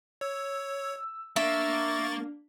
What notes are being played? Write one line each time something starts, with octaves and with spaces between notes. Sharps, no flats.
C#5 E6
A#3 D4 E5 C#6 A6